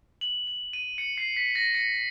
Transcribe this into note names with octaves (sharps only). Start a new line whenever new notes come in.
F#7
F#7
D#7
C#7
C7
B6
A#6
C#7